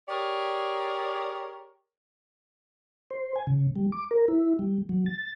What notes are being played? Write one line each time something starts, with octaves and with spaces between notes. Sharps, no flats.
G4 G#4 A#4 C#5 D5
C5
G#5
C#3
G3
D6
A#4
E4
G3
F#3
A6